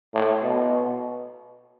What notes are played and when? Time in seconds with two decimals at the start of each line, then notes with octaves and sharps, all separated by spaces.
0.14 A2
0.42 B2